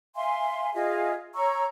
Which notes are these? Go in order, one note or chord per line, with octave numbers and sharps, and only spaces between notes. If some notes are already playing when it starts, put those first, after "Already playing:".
E5 F5 G#5 C6
F4 G#4 D#5 E5
C#5 A#5 C#6 E6